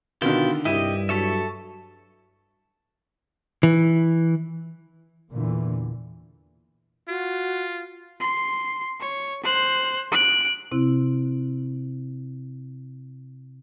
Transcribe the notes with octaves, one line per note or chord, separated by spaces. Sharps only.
B2 D3 D#3 E4 F4 G5
C2 G2 E4 G4 D#5
F#3 A4 C#5 E5
E3
E2 A#2 D3 E3
F4 F#4
C6
C#5
C5 F#6
F#6 D7
C3 C4 E4